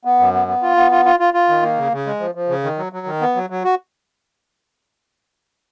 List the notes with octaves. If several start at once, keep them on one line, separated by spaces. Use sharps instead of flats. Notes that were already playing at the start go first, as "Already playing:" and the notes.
B3
F#2
B3
B3
F4
B3
F4
F4
F4
F4
D#3
A#3
C#3
C#3
G#3
F3
F3
C#3
D#3
F#3
F#3
D#3
B3
F#3
F#3
F#4